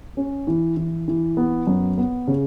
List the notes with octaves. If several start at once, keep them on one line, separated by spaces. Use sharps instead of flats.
C#4
E3
E3
E3
B3
F#2
B3
C#3